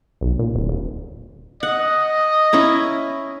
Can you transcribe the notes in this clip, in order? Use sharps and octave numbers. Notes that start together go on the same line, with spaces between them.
B1
A#2
D1
D#1
D#5 F#5
C#4 E4 A#5